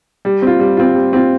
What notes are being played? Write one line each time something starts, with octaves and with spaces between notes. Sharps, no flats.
G3
C4 F4
G3
C4 F4
G3
C4 F4